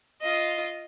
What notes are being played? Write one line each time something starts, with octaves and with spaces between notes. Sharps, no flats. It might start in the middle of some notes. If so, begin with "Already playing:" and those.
F4 D#5